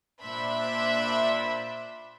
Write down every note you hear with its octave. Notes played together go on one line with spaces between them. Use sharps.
A#2 D4 C5 E5 B5